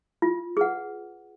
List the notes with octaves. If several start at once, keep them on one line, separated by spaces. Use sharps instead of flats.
F4
G#4 B4 F#5